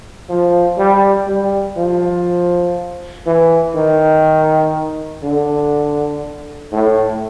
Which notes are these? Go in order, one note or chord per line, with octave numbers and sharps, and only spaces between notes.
F3
G3
G3
F3
E3
D#3
D3
A2